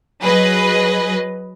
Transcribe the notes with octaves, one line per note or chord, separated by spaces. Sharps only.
F#3 G#4 B4 D#5